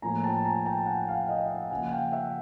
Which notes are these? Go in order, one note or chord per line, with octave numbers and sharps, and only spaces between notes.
A2 F3 A#3 G#5 A#5
G5 A5
G#5 A#5
G5 A5
F#5 G#5
F5 G5
D#5 F5
E5 F#5
C#3 F3 A#3 F#5 G#5
F5 G5
E5 F#5